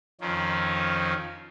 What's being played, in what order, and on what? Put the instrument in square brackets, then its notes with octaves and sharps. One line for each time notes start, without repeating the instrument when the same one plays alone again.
[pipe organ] F2 D#3 F3 C#4 D#4